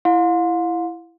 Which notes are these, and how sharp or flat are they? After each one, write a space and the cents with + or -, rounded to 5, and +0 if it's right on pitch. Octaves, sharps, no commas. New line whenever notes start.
E4 +15 F5 +40 C6 +0